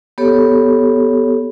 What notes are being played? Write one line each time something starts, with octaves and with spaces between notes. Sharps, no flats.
B3 G4 A4 C#5